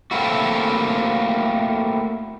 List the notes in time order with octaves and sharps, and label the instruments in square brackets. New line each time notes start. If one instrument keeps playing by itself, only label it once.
[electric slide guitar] A3 A#3 C4 E4 F#4